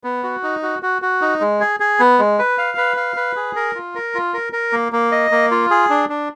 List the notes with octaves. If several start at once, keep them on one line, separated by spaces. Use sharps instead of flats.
B3
F#4
D#4
F#4
F#4
F#4
D#4
G#3
G#4
G#4
B3
G#3
B4
F5
B4
F5
B4
G#4
A#4
F4
A#4
F4
A#4
A#4
A#3
A#3
D#5
A#3
F4
G#4
D4
D4